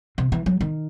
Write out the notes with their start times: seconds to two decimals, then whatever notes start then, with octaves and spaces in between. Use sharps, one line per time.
0.18 C3
0.32 E3
0.46 F#3
0.61 D#3